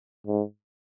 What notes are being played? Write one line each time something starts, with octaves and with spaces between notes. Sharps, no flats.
G#2